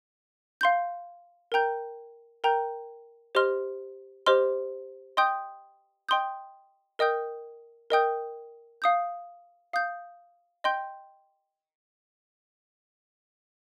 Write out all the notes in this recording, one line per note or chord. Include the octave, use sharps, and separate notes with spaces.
F5 C6 G6
A#4 G5 A#5 G6
A#4 G5 A#5 G6
G4 C5 D#5 C6 F6
G4 C5 D#5 C6 F6
D#5 G5 C6 D#6 G6
D#5 G5 C6 D#6 G6
A#4 D#5 G5 D#6 G6
A#4 D#5 G5 D#6 G6
F5 D#6 G6
F5 D#6 G6
D#5 G5 C6 G6